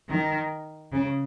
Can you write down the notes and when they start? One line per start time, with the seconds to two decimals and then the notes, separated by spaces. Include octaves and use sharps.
0.08 D#3
0.93 C#3